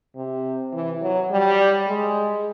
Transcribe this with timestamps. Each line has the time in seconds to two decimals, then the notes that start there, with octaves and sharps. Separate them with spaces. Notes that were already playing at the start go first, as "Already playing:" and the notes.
0.16 C3
0.73 E3
1.01 F#3
1.31 G3
1.87 G#3